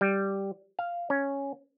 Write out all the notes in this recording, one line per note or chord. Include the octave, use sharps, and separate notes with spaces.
G3
F5
C#4